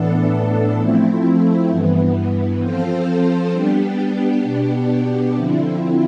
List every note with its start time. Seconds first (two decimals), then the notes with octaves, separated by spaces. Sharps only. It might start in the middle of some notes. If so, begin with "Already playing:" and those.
Already playing: A2 E3 B3 D4 A4
0.78 F3 A3 C4 E4
1.70 G2 E3 B3
2.60 F3 C4 F4 A4 C5
3.52 G3 B3 D4 G4
4.43 B2 B3 D4 G4
5.35 D3 F3 C4 E4